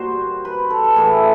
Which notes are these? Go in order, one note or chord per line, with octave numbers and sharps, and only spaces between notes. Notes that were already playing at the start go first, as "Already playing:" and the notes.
Already playing: A#2 G3 F#4 C5
B4
A4
A4
A2 E3 A3 G#4